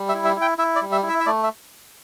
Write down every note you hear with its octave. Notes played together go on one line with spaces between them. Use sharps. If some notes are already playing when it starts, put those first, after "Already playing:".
Already playing: G3
E5
E4
E5
E4
G5
E4 E5
D5
G3
E5
E4
E5
E5
A3 D5
E5